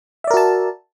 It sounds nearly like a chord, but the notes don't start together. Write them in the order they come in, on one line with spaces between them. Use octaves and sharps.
E5 D5 A#4 F#4 A5